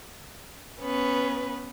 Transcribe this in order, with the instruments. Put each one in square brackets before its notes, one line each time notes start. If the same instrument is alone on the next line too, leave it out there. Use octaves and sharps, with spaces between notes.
[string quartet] B3 C#4 B4